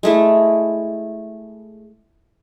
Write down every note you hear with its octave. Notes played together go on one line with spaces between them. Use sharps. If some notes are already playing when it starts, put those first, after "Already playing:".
G#3 A3 E4